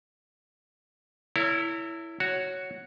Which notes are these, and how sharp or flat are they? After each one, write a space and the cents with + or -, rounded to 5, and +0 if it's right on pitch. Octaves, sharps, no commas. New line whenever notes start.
E4 +0 A#4 -45 C#5 +20
F#4 +0 C#5 +0